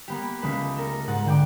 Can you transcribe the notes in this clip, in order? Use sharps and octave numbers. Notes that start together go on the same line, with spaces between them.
A#3 B3 G4
C#2 A3 B4
A4 A#4
G#2 F#5 A6
D3 G5 D6